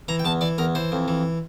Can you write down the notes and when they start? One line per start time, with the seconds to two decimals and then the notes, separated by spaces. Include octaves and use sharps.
0.08 E3 A#5
0.19 G5
0.25 E2 A5
0.41 E3 D5
0.58 E2 A#4
0.75 E3 C5
0.92 F2
1.08 E3